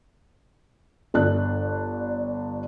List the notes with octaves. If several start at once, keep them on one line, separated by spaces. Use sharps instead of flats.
G1 D4 F#6